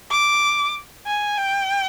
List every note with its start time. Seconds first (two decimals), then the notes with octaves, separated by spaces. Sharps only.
0.11 D6
1.07 G#5
1.38 G5